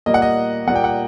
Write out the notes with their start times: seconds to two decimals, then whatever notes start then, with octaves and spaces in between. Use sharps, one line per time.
0.06 A#2 G3 A#3 D#5
0.14 F#5
0.22 D#5
0.67 A#2 G3 A#3 F#5
0.75 G5
0.84 F#5